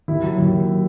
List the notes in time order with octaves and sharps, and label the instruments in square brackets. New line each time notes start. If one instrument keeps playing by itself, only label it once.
[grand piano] D#2 E4
F#3
D#2
F#3